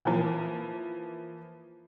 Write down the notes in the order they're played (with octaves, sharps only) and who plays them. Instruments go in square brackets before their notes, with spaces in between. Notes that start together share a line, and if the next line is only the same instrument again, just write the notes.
[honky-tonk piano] E3 F3 A#3